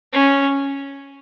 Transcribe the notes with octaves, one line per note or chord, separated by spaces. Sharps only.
C#4